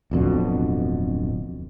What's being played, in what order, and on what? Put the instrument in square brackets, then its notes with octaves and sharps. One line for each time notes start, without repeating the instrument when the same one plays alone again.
[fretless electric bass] D1 F2 B2 D3